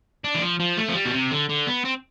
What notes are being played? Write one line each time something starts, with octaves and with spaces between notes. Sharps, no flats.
D4
E3
F3
F3
A3
F3
G3
B2
C3
D3
D3
B3
C4